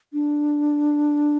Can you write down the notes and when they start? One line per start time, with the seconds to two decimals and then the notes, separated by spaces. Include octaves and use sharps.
0.13 D4